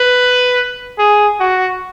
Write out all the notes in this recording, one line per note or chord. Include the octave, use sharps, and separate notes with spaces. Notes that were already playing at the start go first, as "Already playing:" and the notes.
Already playing: B4
G#4
F#4